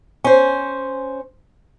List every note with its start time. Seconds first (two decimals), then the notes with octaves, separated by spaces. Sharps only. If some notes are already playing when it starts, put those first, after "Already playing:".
0.24 C#4 C5